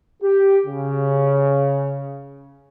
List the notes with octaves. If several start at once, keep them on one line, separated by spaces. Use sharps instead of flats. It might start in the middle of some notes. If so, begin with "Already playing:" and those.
G4
C#3